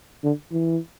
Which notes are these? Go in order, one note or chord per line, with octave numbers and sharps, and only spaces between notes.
D3
E3